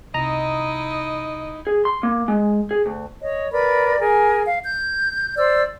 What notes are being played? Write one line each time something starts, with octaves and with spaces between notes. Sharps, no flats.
C2 D#4 E4 D#5 A#5
G#4
C6
A#3
G#3
G#4
D2
C#5 D#5
A#4 B4 D5 B5
G#4 A#4 G#5
F5
G6
C5 D5 E6